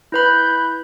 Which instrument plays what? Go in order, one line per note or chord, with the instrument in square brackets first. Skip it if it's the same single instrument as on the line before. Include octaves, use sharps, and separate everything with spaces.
[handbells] E4 B4 B5 [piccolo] G6